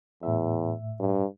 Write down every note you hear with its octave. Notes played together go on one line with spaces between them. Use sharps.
E2 A2 E5
G2